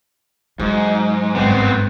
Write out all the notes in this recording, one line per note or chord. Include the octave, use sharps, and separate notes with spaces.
G#2 F#3
G#1 G2 B3 C4